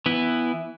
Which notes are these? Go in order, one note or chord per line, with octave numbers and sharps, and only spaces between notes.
E3 B3 E4